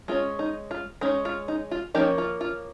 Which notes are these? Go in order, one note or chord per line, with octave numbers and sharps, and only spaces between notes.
G#3 C#4 F4
D#4
F4
G#3 C#4 D#4
F4
D#4
F4
F3 A#3 C#4 D#4 G4
F4
F4